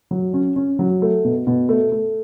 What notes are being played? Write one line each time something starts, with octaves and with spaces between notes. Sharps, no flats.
F#3
C#4
C#4
F#3
A3
B2
B2
A3
A3